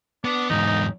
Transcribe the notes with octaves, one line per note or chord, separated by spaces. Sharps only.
B3 D4
E2 G#2 D#4